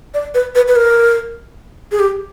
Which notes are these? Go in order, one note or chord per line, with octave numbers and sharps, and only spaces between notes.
D5
B4
B4
B4
A#4
G#4
G4